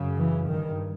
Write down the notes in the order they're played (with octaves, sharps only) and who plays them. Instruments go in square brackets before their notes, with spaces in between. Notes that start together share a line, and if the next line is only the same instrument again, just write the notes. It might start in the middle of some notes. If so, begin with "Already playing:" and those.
Already playing: [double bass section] F#2 C#3
E3
G2 D#3